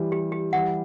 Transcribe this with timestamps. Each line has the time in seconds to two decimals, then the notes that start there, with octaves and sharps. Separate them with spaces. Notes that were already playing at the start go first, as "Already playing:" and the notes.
Already playing: E3 G3
0.12 G4
0.32 G4
0.53 E3 G3 F#5